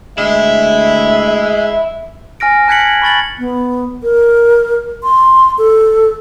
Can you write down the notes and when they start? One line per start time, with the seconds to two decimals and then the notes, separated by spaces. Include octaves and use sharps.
0.18 D2 G#3 E4 E5
2.40 G#5 F6 A#6 D7
2.68 A5 F#6 G#6 B6 C#7 F#7
2.81 G#6
3.02 B5 C#6 A6 F#7
3.39 B3
4.03 A#4
5.03 C6
5.58 A4